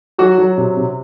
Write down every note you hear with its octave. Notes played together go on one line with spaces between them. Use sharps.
F#3 F#4
F#3
C3
C3